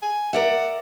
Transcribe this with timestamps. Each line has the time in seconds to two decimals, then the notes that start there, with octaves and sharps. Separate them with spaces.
0.02 G#5
0.33 A#4 D5 E5 F#5